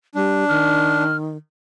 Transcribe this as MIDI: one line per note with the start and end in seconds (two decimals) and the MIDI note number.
0.15 0.44 55
0.15 1.03 62
0.49 1.37 51
0.49 1.16 89